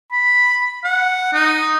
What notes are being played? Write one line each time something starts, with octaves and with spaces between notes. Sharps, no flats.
B5
F#5
D#4